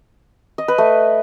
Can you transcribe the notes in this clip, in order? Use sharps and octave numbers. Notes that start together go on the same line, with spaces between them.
D#5
B4
A3